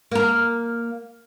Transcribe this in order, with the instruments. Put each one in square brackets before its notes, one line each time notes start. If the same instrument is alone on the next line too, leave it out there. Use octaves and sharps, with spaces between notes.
[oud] A#3 A#4